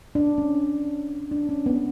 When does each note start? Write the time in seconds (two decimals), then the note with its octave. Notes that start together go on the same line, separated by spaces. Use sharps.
0.15 D4
0.38 C#4
1.32 D4
1.49 C#4
1.66 B3